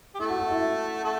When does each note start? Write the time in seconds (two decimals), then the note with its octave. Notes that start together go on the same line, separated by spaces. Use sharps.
0.15 G4
0.19 A3 E4 A4
0.30 F#4
0.40 F#4
0.51 E4
1.04 A3 A4